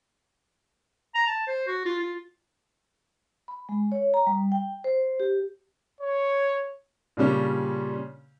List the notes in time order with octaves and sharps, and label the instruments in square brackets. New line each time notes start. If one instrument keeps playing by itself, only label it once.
[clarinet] A#5
A5
C5
F#4
F4
F4
[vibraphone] B5
G#3
C#5
A#5
G3
G5
C5
G4
[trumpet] C#5
[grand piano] A#2 C#3 G3 C#4 D4